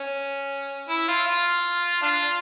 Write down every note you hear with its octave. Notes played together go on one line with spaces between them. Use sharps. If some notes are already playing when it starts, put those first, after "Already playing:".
Already playing: C#4
E4
F4
F4
D4 F4